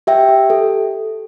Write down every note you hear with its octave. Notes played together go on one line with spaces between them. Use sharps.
G4 E5 G5
G4
A4